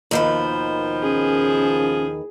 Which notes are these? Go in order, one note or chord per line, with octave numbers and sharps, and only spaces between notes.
D#2 B2 D#3 F3 B4
C#4 G#4